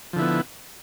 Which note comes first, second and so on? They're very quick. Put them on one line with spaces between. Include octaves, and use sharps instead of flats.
F3 D3 E4 B3